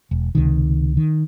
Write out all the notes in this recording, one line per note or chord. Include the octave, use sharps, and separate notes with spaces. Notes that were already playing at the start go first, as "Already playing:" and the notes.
E1
C#2 C3 D#3
D#3